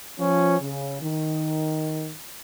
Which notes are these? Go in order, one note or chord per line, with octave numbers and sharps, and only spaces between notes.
F3 C#4
C#3
D#3